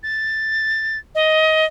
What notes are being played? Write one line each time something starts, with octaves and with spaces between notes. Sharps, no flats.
A6
D#5